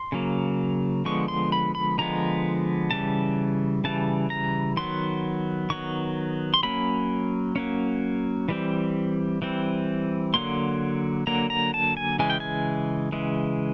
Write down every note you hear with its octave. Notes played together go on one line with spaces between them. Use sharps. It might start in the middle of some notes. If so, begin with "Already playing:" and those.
Already playing: C6
C#3 F#3 A#3
D3 F3 G#3 B3 C#6
C6
B5
B5
D3 F3 G#3 B3 A#5
C#3 E3 G3 A5
C#3 E3 G3 A5
A#5
D#3 F#3 B3 C6
D#3 F#3 B3 C#6
C6
F#3 A#3 C#4 B5
F#3 A#3 C#4
E3 G3 C4
E3 G3 C4
D3 F#3 A#3 C6
D3 F#3 A#3 A#5
A#5
A5
G#5
C#3 E3 G#3 G#5
G5
G#5
C#3 E3 G#3